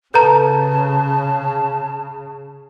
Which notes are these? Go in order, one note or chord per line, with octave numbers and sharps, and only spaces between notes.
C#3 A4 B4 A5 A#5 G6